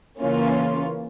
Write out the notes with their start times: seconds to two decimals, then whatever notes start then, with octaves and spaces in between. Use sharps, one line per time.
0.18 C#3 E3 A#3 C#4 F4